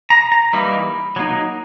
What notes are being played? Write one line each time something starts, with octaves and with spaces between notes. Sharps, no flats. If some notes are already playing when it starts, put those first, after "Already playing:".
A#5
A#5
E3 G3 A#3 D#4 B5
F#3 A#3 D#4